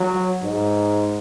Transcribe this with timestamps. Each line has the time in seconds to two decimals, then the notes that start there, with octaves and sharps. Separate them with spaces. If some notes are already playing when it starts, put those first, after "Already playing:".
Already playing: F#3
0.42 G#2